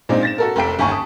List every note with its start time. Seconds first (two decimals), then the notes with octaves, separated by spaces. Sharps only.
0.09 A#2 G#3 C4 D4 D#4
0.23 A6 A#6 E7
0.38 F#4 A4 A#4
0.56 F1 C2 A4 G5 B6 D7
0.79 G1 D#2 G#5 C#6
0.91 A5 D#6